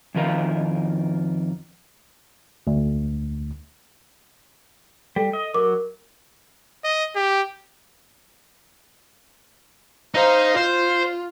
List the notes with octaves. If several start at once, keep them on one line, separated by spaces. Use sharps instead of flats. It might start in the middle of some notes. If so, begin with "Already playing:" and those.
F2 D#3 F4 A#4 F5
D2
G3 A4
D#5
F#3 A#4 D6
D#5
G4
D#4 C5 F5
F4 C5